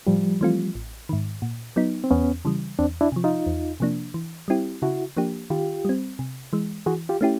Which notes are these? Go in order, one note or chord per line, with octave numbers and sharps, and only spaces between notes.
A2 F3 G3
E3 A3 C4 F4
A1
G#2 D#3
A#2
F#3 B3 D#4
C4
E2 B3 C#4
C#3 E3 G3
E2 C4 D4
D4 E4
C3 F3
D#4 F4
E2
C3 F3 A#3 D4
E3
G3 C4 E4 G4
C#3 E4 F#4
F3 A#3 D4 G4
D#3 F4 G4
G3 C4
C3
E3 G#3
E3 F#4 G#4
F4 G4
A3 C#4 E4 G4